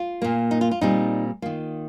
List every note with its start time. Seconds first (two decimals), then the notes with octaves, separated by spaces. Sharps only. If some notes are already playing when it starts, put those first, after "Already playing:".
Already playing: F4
0.22 A#2 A#3
0.51 D#4
0.61 F4
0.71 F4
0.81 A#2 G3 C4 D#4
1.42 D#3 A#3 F4